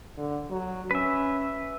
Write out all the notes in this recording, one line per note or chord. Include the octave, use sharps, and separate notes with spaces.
D3
F#3
C#4 B4 E5